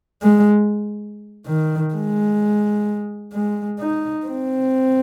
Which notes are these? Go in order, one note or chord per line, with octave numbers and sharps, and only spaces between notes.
G#3
D#3
G#3
G#3
D#4
C4